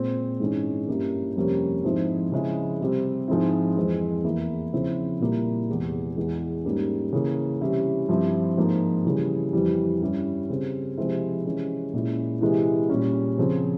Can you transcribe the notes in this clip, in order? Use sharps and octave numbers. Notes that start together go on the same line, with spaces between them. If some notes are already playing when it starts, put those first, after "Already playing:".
Already playing: A#2 G#3 C4
G#2 E3 G#3 C#4
G2 G3 A#3 C#4 E4
F2 C3 G3 A#3 C#4
G#2 F3 C4 E4
C#3 F3 G#3 E4
C3 G3 C4
G#2 F3 G#3 C4 E4
F2 E3 G#3 C4
E2 E3 A#3 E4
C#3 F3 C4 E4
A#2 G3 A#3 E4
E2 C3 E3 G#3
E2 E3 G#3
G#2 G3 A#3 C#4
C#3 E3 A#3
C3 E3 G3 C#4 E4
G2 F3 C4 E4
G#2 F3 A#3
C#3 E3 G3
F2 E3 G3
G2 G3 C#4 E4
C#3 G3 C4
C3 F3 G#3 C4 E4
C3 E3 G#3 C#4 E4
A#2 G#3 C#4 E4
C3 E3 G#3 E4
A#2 G3 C#4
C#3 F3 C4